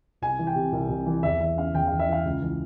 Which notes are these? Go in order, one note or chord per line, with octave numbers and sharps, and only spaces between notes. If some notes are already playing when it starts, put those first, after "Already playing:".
C2 G#5
E3
G5
C3
C2
C2
E3
E2 E5
E3 E5
C#3 F5
E2 G5
F5
E2
E5
E3 F5
C#2
E3